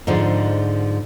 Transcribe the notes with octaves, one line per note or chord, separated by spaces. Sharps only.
G#2 D3 F3 G#3